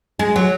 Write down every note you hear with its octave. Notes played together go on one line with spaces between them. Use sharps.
G#3
F#3